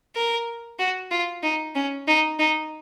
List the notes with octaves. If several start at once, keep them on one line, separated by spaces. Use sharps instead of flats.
A#4
F#4
F4
D#4
C#4
D#4
D#4